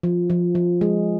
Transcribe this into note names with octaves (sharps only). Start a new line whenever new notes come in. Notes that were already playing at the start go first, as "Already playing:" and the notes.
F3
F3
F3
G#3